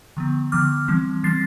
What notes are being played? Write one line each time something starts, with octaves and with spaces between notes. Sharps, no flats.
D3 F3 B3
D3 F3 B3 D6 F6
E3 G3 C4
E3 G3 C4 A6 C7